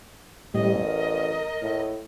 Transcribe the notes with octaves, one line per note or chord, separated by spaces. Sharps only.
A1 A2 G3 D#5
A#4
A2